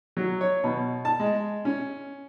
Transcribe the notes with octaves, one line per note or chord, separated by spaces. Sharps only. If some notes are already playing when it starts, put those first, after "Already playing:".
F#3
C#5
B2
A5
G#3
C#4